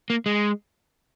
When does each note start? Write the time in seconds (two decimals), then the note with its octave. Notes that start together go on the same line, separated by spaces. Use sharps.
0.10 A#3
0.26 G#3